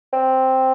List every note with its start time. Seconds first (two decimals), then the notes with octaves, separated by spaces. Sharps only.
0.13 C4